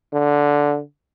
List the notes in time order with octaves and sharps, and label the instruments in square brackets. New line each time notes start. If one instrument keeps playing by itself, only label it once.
[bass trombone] D3